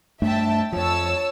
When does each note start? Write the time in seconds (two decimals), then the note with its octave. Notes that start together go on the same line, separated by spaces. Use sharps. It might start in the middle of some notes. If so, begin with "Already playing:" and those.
0.22 G2 A3 D4 E5 G5 A5
0.73 F2 F3 C#5 A5 E6